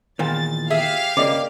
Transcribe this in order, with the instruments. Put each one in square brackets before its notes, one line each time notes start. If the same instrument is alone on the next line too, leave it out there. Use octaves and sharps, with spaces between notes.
[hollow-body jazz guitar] E2 A#2 D#3 [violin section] A6
[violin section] G4 F5 [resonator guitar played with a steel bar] G#4 E5
[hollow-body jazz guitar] C#3 A#3 [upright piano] D5 D#5 D6